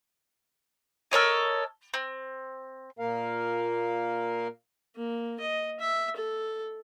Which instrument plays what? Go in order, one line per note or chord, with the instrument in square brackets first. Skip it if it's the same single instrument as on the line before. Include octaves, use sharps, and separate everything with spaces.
[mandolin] A4 A#4 C#5 D#5
C4
[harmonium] A#2 A#3 A#4 F5
[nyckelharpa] A#3
D#5
E5
A4